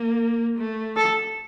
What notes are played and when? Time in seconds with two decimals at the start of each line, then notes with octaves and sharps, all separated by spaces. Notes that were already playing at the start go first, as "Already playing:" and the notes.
Already playing: A#3
0.58 A3
0.96 A4